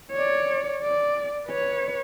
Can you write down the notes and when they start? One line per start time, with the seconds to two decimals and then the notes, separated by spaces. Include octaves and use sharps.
0.12 C#5 D5
0.82 D5
1.47 B4 C#5